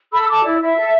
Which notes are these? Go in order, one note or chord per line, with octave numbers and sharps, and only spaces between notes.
A4 B5 E6
A4 A5 D6
E4 D5
E4 E5
A4